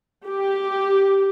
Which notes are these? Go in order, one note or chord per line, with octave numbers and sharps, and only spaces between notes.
G4